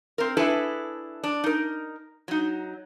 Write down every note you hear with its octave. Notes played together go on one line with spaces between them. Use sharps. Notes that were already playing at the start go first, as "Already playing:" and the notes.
C4 A#4
D4 E4 G#4 A4 B4 E5
D4
D#4 A#4
F#3 D#4